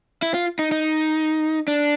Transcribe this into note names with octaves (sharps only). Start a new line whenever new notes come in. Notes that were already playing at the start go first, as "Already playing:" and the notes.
E4
F4
D#4
D#4
D4